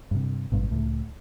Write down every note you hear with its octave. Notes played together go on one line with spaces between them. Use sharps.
G2 C3
G#1 G2 B2
C#2 A2